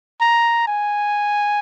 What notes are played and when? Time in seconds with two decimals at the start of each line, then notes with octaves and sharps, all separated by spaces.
0.21 A#5
0.67 G#5